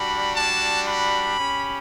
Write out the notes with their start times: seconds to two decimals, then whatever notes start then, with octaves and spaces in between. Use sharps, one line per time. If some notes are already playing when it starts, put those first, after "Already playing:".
Already playing: G3 D4 F#4 B5
0.34 A5
0.87 B5
1.39 C#4 G4